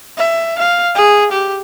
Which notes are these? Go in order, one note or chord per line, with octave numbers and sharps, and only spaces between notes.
E5
F5
G#4
G4